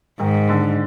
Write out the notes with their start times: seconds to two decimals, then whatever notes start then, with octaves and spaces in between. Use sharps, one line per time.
0.20 G#2 D#3
0.49 D3